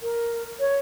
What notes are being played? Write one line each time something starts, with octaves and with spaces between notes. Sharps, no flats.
A#4
C#5